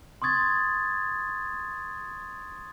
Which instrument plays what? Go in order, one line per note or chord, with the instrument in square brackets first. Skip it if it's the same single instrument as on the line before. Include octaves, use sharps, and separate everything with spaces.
[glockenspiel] C6 C#6 D#6 G#6 A6